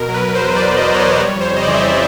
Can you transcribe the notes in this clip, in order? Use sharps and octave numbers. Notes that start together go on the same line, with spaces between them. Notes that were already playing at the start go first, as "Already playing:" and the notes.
Already playing: B2 A#4
F#3
B4
B2
C5
E2
E2 D5
B2 D#5
E2
C#5
F#3 D5
G3 C#5
F2 C5
C#3 D#5
D5
E3
E5
D#5